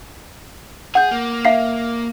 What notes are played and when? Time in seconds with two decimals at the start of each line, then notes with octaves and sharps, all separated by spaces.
0.95 G#4 F#5 G6
1.11 A#3
1.45 E5 F5 C7